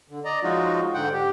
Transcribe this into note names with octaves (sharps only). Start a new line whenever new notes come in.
D3
D5 D#5 A#5
F3 F#3 G#3 D#4 F4 F#4
G#2 D3 F#5 G5
G4